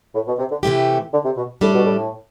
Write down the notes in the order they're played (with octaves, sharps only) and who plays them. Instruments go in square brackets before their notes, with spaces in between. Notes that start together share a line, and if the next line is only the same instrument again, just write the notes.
[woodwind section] A2
B2
C3
D3
[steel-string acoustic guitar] C3 E3 A3 E4 G4
[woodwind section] D3
C3
B2
[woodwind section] A2 [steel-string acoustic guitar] G3 D4 A4 D5
[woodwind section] B2
A2